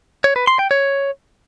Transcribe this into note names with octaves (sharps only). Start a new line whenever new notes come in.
C#5
B4
C6
G5
C#5